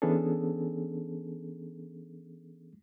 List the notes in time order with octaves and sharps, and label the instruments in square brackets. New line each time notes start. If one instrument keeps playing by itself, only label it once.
[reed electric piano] E3 B3 C#4 D4 G#4 A4